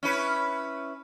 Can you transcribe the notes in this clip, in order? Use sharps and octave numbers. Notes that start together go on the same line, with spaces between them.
C#4 E4 B4